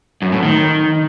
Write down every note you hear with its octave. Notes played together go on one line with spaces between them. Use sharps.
F#2
A2
D#3